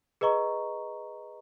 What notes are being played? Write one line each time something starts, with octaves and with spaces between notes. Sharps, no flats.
G#4 B4 D#5 A#5 C#6